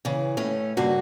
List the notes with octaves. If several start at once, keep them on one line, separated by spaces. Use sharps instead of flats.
C#3 E3
A2 A3 C#4
G2 C#3 A#3 F#4